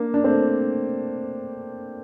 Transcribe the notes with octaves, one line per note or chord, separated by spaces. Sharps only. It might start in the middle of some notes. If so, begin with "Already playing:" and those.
Already playing: A#3 D4
D4
A3 C4